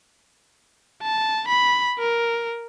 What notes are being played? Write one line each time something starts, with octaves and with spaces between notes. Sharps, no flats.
A5
B5
A#4